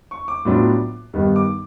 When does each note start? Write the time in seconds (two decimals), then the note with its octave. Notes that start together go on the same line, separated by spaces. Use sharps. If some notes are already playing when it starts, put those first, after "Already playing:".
0.11 C#6
0.28 D6
0.45 A2 F#3 B3 D4 F4
1.14 G2 D#3 G3 B3
1.36 D6